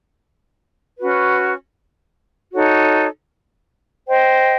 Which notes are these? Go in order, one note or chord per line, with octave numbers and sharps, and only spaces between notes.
C#4 F#4 B4
D#4 F#4 A4 C#5
C5 D#5 G5